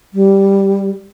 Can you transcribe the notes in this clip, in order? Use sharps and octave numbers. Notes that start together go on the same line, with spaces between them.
G3